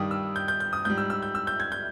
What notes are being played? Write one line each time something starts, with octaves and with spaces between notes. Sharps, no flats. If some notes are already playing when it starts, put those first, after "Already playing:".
Already playing: G2 D#3 G3 D#6
E6
G6
G6
G6
D#6
G#2 G3 G6
E6
E6
G6
E6
G6
G#6
G6